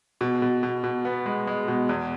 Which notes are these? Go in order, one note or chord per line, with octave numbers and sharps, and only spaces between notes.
B2
B2
B2
B2
B3
G#3
G#3
B2
E2